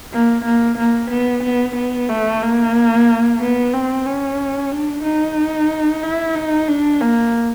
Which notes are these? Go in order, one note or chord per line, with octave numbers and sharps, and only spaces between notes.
A#3
A#3
A#3
B3
B3
B3
A3
A#3
B3
C4
C#4
D4
D#4
E4
D#4
D4
A#3